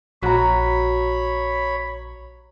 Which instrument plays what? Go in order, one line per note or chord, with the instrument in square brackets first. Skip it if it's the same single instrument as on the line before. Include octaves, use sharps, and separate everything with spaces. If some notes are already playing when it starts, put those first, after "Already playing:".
[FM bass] A#1 [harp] F#4 A#5 [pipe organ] C#5 B5